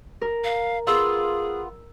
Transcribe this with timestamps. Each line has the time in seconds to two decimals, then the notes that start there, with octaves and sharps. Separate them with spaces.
0.21 A#4
0.44 F5
0.87 B3 F4 G#4 E6